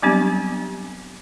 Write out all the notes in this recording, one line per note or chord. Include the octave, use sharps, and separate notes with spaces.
F#3 G3 B3 C4 D4 G4